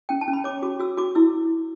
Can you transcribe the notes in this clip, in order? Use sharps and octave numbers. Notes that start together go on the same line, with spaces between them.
C#4 G5
A5
C#4
B5
C#5 D6
F#4 D6
F#4 E6
F#4 D6
E4 E6